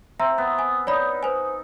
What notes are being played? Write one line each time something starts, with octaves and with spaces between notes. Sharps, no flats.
C4 E5 A#5 C6
B3
G#5
D#4 C#5 D5 B5
B4 C5 G#5